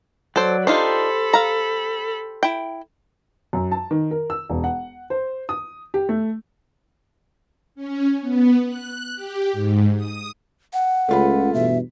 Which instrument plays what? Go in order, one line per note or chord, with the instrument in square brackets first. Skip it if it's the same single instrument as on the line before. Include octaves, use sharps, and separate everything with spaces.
[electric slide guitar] F#3 D5 [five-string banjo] A4 C5
[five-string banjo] D4 D#4 F4 [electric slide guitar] G4 C5 [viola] A4 B5
[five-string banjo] F5 A#5
E4 G5
[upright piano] F#2
A5
D#3
A#4
E6
E1
F#5
C5
D#6
G4
A3
[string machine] C#4
B3
F#6
G4
G#2
D#6
[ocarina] F#5
[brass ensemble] C#2 [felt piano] A3 F4 B5
[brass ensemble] E2 G2 B2 [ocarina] E5